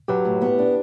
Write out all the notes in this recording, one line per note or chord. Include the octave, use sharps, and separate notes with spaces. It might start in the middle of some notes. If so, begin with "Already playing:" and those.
F#3 G4 B4
A2
B3
D4